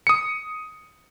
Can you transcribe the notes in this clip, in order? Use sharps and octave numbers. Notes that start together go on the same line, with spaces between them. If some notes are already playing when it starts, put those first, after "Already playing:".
D#6 C#7